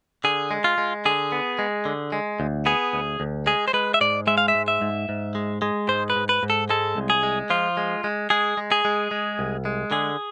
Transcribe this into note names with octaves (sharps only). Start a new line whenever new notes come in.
D3 G#4
G#3
F4
G#3
D3 G#4
B3
G#3
D3
G#3
D2
B3 G#4
D2
D2
G#3 G#4
C5
G#3 B4
E5
G#2 D5
G#3 E5
F5
E5
G#2
E5
G#2
G#2
G#3
G#3
G#2 C5
B4
G#2
B4
G#2
A4
G#3 A4
C2
G#4
G#3
F3 F4
G#3
G#3
G#3 G#4
G#3
G#4
G#3
G#3
C2
G#3
D3 G#4